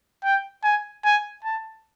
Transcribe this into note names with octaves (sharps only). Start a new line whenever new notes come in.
G5
G#5
G#5
A5